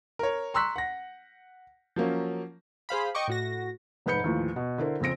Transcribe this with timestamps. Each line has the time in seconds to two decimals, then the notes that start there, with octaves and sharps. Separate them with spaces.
0.19 A#4 C#5
0.54 A#5 C6 C#6 E6 F#6 B6
0.76 F#5 A#6
1.96 F3 F#3 A#3 C#4
2.89 G#4 C5 F5 B5
3.15 D#5 G5 C#6 D6
3.28 A2 F#4 A#6
4.06 F1 G#2 B4 B5 G6 C#7
4.24 D#2 A2 E3 F3
4.56 B2
4.78 D3 E4 A#4 C5
5.00 F2 C#3 C4 A#6 D7